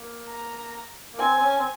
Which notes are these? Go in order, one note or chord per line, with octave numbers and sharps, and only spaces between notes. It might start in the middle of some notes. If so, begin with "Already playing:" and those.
Already playing: A#3
A#5
A#3
C4 G#5
C4
C#4
C4